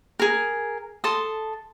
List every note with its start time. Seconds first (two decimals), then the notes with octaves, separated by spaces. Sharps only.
0.19 G#4 A#4
1.04 A4 A5 C6 D#6